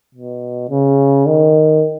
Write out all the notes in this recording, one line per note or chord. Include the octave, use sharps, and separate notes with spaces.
B2
C#3
D#3